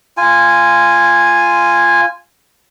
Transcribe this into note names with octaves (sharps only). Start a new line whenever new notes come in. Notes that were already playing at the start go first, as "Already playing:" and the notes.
F4 G#5